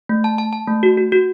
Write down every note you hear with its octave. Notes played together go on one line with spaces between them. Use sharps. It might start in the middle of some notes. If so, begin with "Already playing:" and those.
A3
A5
A5
A5
A3
F#4
F#4
F#4